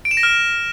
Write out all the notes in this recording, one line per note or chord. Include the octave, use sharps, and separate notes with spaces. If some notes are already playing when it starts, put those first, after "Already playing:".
D7
E7
A#6
F6